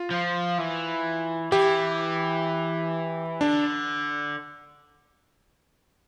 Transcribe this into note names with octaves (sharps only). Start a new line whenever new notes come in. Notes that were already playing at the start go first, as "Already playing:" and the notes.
Already playing: F4
F3
E3
E3 G4
D3 D4